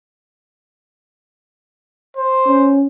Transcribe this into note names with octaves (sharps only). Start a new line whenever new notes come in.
C5
C#4